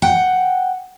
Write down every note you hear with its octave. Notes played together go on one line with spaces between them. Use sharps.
F#5 G5